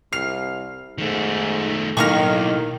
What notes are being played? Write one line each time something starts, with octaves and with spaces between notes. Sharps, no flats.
C2 F6 C7
G#2 D#3 A3
B1 A2 D#3 A#3 C#6 D#6 F6 A#6